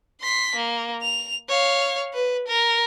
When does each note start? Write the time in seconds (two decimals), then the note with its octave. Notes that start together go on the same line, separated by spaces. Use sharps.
0.21 C6 B6
0.55 A#3
1.02 F7
1.48 C#5 F5
2.13 B4
2.47 A#4